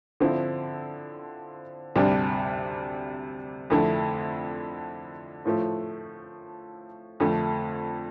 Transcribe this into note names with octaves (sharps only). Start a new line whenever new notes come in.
D3 F3 C4 E4
D2 C3 G3 D4
F2 D3 A3 E4
A2 F3 A3
F2 D3 A3